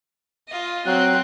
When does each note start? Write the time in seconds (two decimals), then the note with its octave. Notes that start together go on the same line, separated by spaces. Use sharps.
0.48 F4 D#5
0.86 F#3 C4 F#4 F#6